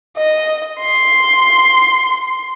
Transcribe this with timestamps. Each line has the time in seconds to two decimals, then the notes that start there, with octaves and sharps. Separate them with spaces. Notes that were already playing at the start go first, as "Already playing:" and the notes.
0.17 D#5
0.81 C6